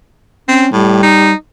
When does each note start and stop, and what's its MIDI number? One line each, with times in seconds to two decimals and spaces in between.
0.48 0.66 60
0.48 0.70 61
0.73 1.00 45
0.73 1.33 55
1.03 1.33 63